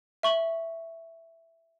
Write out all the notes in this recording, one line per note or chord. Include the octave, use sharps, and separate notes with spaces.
E5 C#6 F#7